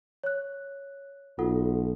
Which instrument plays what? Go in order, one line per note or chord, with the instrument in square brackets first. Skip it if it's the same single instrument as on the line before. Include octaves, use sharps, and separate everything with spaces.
[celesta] C#5 F#6
[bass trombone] B1 [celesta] F4 A4 F#5